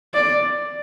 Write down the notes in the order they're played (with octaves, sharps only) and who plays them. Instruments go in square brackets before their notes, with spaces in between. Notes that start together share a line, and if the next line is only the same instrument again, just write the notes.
[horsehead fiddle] D5